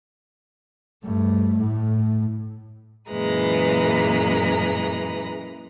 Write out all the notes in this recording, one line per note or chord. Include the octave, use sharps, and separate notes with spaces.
G2 A3
A2
F#2 A#2 E3 G#3 B4 A#5